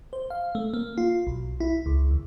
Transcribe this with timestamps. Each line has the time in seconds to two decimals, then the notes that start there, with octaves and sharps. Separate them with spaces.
0.13 C5
0.30 F5
0.55 A3
0.74 A#3
0.98 F4
1.27 B1
1.60 E4
1.86 C#2
2.11 D#2